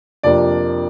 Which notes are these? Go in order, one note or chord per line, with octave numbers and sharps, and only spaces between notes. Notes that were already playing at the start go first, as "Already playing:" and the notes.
F2 C3 F3 A#3 D4 D5